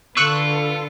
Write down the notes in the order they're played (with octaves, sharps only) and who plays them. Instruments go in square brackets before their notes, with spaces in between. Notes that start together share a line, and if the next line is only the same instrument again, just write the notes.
[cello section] D3 A4 B4 [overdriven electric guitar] F4 [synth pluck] C#6 E6 F#6